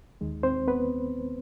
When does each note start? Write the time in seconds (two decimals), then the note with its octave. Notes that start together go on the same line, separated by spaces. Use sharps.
0.21 D#2 D#3 G#3
0.43 C4 C5
0.68 B3 B4